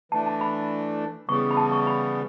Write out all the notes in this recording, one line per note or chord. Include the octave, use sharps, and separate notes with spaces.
E3 A3 D4 A5
A5
B5
C#3 E3 G3 B3 C#6
B5
A5
C#6
C#6
B5